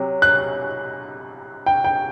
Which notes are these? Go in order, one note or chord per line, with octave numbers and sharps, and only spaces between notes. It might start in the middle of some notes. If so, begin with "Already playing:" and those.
Already playing: C3 F#3
F#6
G5
G5